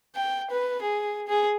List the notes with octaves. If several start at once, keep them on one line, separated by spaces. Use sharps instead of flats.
G5
B4
G#4
G#4